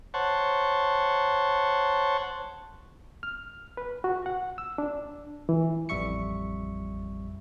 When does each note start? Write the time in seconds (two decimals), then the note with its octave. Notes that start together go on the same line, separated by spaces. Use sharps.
0.14 C5 C#5 F#5 A5
3.23 F6
3.77 B4
4.04 F#4
4.26 F#5
4.58 E6
4.78 D4
5.49 E3
5.89 A1 F2 G3 E5 C#6 C#7